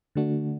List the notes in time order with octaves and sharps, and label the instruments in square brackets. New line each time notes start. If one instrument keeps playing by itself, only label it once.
[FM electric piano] D3 A3 D4 F#4